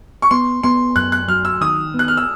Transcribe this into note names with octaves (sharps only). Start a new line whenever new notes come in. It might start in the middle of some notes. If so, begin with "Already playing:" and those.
C#6
B3 C6
B3 C6
F#2 F#6
F#6
F#3 F6
E6
D#3 D#6
B3
F#6
F6
E6